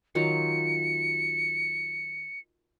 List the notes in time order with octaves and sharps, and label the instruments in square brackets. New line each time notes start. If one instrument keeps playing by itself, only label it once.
[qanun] D#3 F#3 F4 [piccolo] C#7